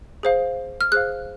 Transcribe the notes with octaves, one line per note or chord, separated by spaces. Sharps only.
G#4 C5 F5
F6
G#4 C5 F5 F#6